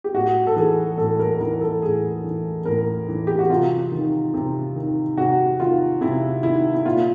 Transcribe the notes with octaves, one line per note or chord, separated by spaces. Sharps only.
G4
A2 F#4
A4
E3 G#4
A2 A4
A#4
E3 A#4
A4
A2 G#4
E3
A2 A#4
E3
G4
F#4
C3 F4
D#3
C3
D#3
C3 F#4
D#3 F4
C3 E4
D#3 E4
E4
A#2 F4